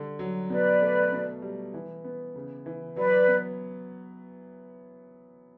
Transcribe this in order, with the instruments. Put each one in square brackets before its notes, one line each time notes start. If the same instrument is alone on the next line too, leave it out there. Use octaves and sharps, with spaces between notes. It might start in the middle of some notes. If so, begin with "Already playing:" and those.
Already playing: [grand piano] D3 G3
F#3
[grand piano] B2 [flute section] B4 D5
[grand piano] A3
B2
G3
E3
B3
C#3
E3
[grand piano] F#3 [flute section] B4 D5
[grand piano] B3